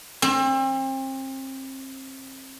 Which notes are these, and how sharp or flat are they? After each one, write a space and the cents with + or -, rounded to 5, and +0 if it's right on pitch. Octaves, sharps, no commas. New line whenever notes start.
C4 +35